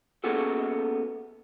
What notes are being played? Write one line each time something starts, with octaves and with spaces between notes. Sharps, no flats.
A#3 B3 C#4 F#4 G#4 A4